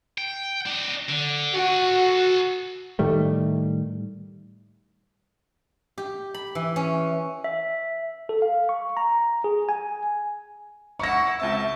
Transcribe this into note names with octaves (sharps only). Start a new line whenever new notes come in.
G5
D4 D#5
D3
F#4 A4 G#5
A2 D#3 G3 A3
G4
B5
E3
C#4
E5
A4
F5
C#6
A#5
G#4
G#5
E4 F#5 C#6 A#6
C#2 C4 E5 A5 E6